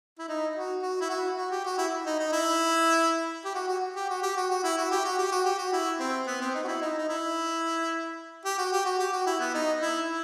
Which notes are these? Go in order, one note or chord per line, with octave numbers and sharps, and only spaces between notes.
E4
D#4
F#4
F#4
E4
F#4
F#4
G4
F#4
E4
D#4
D#4
E4
G4
F#4
F#4
G4
F#4
G4
F#4
F#4
E4
F#4
G4
F#4
G4
F#4
G4
F#4
E4
C4
B3
C4
D#4
F#4
E4
D#4
D#4
E4
G4
F#4
G4
F#4
G4
F#4
E4
B3
D#4
E4
E4